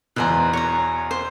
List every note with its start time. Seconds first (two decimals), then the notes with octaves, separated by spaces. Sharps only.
0.16 E2 B2 B4 C5 A#5
0.53 C#5 A#5
1.11 C5